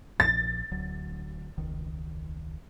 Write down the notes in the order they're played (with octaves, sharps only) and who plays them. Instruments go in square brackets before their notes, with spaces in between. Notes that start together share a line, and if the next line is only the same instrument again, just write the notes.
[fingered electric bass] A#1 A#2 F3 [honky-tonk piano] A6
[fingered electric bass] D1 D2 F#3
E1 C#2 D#3